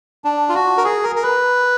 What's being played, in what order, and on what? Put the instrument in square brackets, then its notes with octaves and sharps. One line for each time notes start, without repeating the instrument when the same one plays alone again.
[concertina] D4
F4
F#4
A#4
G#4
A#4
A#4
B4